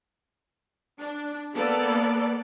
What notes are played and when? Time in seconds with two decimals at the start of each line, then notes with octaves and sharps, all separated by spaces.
0.99 D4
1.54 A#3 B3 A4 D5